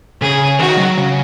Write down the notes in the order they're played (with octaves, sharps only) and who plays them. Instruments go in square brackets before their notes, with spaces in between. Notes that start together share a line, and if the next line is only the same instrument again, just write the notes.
[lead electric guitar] C#3 [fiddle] G#4
[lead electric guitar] D#3 [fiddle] F#4
[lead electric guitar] F#3
C#3